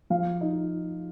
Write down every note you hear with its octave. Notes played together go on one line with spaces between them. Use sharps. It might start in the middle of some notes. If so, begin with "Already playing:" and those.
F3 F5
D#4